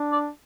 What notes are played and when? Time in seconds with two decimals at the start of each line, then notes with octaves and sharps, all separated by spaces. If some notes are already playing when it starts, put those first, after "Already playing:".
Already playing: D4
0.12 D5